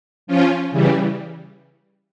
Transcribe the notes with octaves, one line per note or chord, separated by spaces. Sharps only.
F3 C#4 F4
C#3 E3 G3